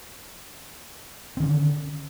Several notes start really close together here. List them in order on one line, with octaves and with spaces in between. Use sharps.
C4 D#3 C#4 D3